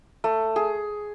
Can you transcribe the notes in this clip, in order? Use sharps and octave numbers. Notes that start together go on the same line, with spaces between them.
A3
G#4